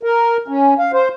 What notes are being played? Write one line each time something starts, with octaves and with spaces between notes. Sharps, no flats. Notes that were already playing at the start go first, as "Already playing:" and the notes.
A#4
C#4
F5
C5